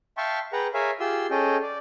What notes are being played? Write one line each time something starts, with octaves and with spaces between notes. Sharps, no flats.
E5 F5 G5 A5 C6 C#6
G#4 B4 F#5 G5 A#5
G#4 A#4 C#5 E5 F5 G#5
F4 G4 G#4 C6 E6
C#4 G#4 A4 D#5 G5
D5